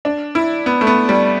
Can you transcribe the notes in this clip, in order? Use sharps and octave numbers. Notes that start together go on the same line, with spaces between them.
D4
E4
B3
A3
B3
G3